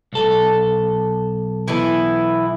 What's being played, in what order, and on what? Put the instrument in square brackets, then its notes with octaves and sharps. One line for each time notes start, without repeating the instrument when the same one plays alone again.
[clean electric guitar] B1 A4
[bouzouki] E3 B3 E4